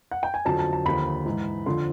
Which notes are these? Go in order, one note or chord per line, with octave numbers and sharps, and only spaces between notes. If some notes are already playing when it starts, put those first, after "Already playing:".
F#5
G5
G#5
F2 D3 F#3 A5
A5
A5
D#2 D3 F3 B5
G#2 E3
F2 D3 F3 C6